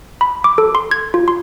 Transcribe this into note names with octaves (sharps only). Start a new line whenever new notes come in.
B5
D6
A4
C6
G#6
F4
C6